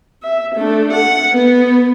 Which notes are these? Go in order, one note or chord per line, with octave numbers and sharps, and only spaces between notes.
E5
A3 D4
F#5
B3